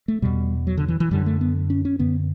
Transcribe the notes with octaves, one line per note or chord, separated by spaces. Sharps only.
A3
E2 B2 G3
F#3
D3
E3
E3
F#2 D3 G3
A3
B3
C#4
C#4
F#2 D3 B3